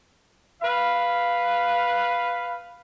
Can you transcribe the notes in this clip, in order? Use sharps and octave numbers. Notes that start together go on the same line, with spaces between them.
B4 F5